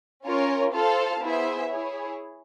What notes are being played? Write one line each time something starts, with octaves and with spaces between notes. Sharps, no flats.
C#4 F4 A#4 C#5
F4 A4 C5 F5 A5
B3 E4 G#4 C5 E5
E4 G#4 C#5